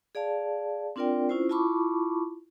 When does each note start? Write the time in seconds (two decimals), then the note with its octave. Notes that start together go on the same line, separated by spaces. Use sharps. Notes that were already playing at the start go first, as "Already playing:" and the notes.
0.15 G#4 D5 F5 A5
0.96 C4 D4 F4 A#4 D5 G5
1.29 C#4 E4 F4 C5
1.49 E4 F4 A5 B5 C#6 D6